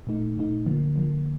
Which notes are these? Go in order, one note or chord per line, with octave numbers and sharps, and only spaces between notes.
A#2 A3 D#4
A#2 A3 D#4
D3 F3 A#3
D3 F3 A#3